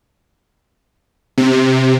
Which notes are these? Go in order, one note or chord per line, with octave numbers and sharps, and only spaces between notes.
C3